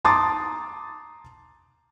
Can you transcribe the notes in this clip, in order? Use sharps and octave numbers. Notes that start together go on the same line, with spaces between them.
A5 A#5 C6 D6 D#6 A6